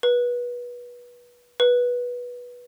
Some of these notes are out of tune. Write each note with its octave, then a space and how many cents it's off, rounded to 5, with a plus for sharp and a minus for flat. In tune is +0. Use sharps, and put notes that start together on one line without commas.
B4 -25
B4 -15